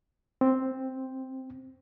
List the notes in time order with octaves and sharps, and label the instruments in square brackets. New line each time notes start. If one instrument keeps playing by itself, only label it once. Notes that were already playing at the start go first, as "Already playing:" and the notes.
[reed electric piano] C4